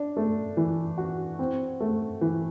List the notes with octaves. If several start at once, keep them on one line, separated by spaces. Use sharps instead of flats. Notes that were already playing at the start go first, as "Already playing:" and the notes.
Already playing: D4
A3
E3
F#4
C4
A3
E3